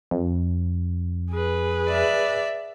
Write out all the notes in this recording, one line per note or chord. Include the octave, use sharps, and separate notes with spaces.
F2
G#4 B4
D5 E5